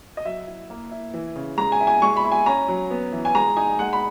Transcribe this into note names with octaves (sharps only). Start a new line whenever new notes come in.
D#5
F#3 E5
E4
A#3
E4
E3
C#3
G#3 A#5
G#5
E4
G#5
G#3 C#6
B5
E4
G#5
C#4 A#5
F#3
B3
E3
G#5
G#3 A#5
D#4 G#5
G#3 F#5
B5